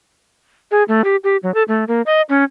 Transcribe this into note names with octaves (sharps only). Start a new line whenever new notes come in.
G#4
A3
G4
G4
F#3
A4
A3
A#3
D#5
C#4